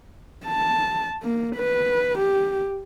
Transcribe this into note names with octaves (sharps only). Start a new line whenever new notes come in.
A5
A#3
B4
G4